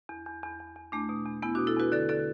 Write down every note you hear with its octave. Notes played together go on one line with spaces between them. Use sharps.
E2
E2
E2
E2
E2
E2 A3 D4
B2
E2
E2 B3 E4
D4 F#4
B2
E4 A4
E2 F#4 B4
D3 A4 D5
D3 A4 D5